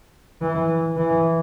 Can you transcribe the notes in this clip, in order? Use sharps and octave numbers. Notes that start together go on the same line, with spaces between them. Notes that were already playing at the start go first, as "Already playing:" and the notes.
E3
E3